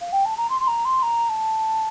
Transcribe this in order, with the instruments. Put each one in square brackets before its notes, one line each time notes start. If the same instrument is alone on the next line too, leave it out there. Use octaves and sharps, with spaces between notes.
[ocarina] F5
G5
A5
A#5
C6
C6
A#5
C6
A#5
A5